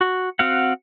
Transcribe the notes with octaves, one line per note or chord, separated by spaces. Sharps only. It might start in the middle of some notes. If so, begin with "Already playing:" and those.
F#4
C4 F#4 F5 F#5